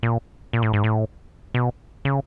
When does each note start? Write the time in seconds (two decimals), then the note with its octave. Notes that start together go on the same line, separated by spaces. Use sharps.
0.03 A#2
0.53 A#2
0.63 A2
0.73 G#2
0.84 A2
1.54 B2
2.05 C#3